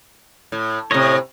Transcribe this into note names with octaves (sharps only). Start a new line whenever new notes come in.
A2
A2 C3 C#5 D#5